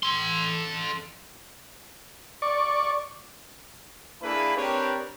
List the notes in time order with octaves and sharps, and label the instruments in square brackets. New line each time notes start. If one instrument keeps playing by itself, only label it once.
[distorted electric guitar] A4 C6
[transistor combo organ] D5 C#6
[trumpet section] A#3 D4 E4 G#4 B4
C4 D4 G4 A#4 B4 C#5